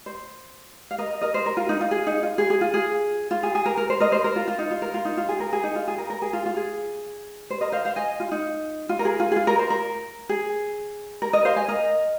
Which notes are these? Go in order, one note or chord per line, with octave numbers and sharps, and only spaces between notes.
C5
F5
A#4 D#5
A#4 D#5
C5
A#4
F4
D#4
F4
G#4
D#4
F4
G#4
G#4
F4
G#4
F4
G#4
G#4
A#4
A#4
C5
A#4 D#5
C5
A#4
F4
F4
D#4
F4
A#4
F4
D#4
F4
G#4
A#4
G#4
D#4
F4
G#4
A#4
A#4
G#4
F4
F4
G#4
C5
A#4 D#5
C5 F5
C5 F5
D#5 G#5
F4
D#4
F4
A#4
G#4
F4
G#4
F4
A#4
C5
A#4
G#4
A#4
A#4 D#5
C5 F5
D#5 G#5
A#4 D#5